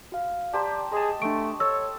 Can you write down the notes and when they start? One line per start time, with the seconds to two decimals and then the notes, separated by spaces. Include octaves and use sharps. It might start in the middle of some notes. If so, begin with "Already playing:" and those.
0.12 F#4 F5
0.53 G4 C5 D5 A5 A#5
0.92 G#4 D#5 A5 C6
1.22 A3 D4 C#6 D7
1.60 A4 C#5 E6